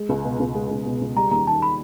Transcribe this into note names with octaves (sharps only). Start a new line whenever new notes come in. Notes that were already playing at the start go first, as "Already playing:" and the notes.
Already playing: G#3
C#2
B2
C#2
G#3
C#2
B2
C#2
G3 A#5
D#2 A#5
D#3 A5
B5